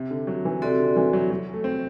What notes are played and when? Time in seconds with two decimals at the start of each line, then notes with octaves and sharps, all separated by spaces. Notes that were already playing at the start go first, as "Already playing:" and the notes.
Already playing: C3
0.11 D3
0.27 F#3
0.45 E3
0.62 C3 C4 F#4 A4 D5
0.79 D3
0.96 E3
1.13 F#3
1.30 F#3
1.53 A3
1.64 C4